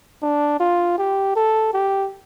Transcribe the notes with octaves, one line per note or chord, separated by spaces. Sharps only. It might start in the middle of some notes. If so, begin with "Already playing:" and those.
D4
F4
G4
A4
G4